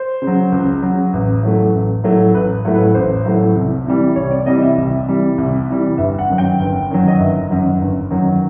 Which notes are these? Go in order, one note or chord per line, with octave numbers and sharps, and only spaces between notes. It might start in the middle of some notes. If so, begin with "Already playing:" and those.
Already playing: C5
C#3
F#3
C#2
C#3 F#3
A1
A2 F#3 A3
A1
A2 F#3 A3
A1 B4
A2 F#3 A3
B4
A1 C5
A2 F#3 A3
C2
C3 E3 G3
C2 C#5
D5
C3 E3 G3 D#5
E5
C2
C3 E3 G3
C2
C3 E3 G3
G1 E5
F#5
F#2 D#3 F#3
G5
G1
F#2 D#3 F#3
D#5
G1 E5
F#2 D#3 F#3
G1
F#2 D#3 F#3